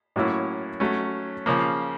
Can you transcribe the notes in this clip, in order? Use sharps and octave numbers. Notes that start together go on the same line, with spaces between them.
A2 F#3 A#3 C#4 E4
F#3 A3 C#4
C#3 F3 A#3